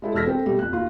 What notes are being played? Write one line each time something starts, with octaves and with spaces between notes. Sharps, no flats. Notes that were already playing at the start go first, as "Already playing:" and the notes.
G#3 E4 A4
E1 A4 E6 F6 A#6 B6
C4 A4 A#4 G5
B2 G3 A3
F2 F#6
D#2 F4